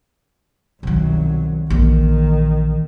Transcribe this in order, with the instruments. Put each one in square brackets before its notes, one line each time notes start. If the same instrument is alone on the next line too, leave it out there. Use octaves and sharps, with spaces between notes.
[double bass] C2 F#3 [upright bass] B2 D#3
[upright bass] A#1 E3 [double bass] D#3